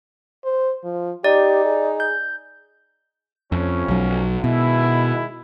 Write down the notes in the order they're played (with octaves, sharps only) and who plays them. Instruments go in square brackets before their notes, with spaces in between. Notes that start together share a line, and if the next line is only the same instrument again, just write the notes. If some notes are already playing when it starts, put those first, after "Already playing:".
[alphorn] C5
F3
[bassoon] D#4 [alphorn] G4 [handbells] D5
[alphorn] G#4
[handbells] G6
[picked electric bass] F2 [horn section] F3 A3 C#4
[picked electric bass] B1 F#3
[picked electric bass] B2 [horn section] D#3 G#3 E4